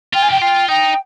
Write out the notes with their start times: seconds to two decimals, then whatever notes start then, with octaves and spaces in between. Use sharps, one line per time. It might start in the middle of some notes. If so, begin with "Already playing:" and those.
0.13 F4 G5
0.22 G#5
0.29 G4 G5
0.40 F4 G5
0.68 D#4 G5